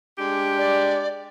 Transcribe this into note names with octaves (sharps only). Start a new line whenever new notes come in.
G#3 D4 G4
D5